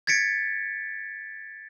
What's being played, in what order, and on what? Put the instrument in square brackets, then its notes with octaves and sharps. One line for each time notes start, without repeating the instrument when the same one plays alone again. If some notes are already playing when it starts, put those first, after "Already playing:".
[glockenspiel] G#6 A6 B6 C#7 D7